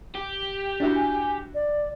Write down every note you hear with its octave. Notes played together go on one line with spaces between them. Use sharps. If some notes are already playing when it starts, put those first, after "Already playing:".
G4
D4 E4 F#4
G#5
D5